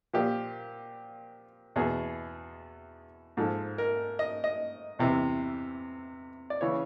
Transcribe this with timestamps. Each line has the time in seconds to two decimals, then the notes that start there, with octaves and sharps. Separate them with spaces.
0.13 A#2 F3 G4
1.76 E2 B2 G#4
3.37 G#2 F3 A4
3.78 A#4
4.19 D#5
4.44 D#5
4.99 E2 C3 E3
6.50 D5
6.61 C#3 E3 C#5